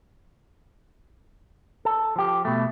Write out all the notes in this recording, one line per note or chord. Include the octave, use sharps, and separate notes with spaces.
A4
F3 G4
B2 A3